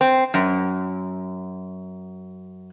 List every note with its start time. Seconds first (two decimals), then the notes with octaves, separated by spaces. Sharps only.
0.01 C4
0.34 F#2